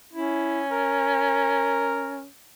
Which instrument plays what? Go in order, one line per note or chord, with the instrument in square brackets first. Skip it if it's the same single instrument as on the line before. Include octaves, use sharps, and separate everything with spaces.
[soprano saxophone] C#4 [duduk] E4
[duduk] A#4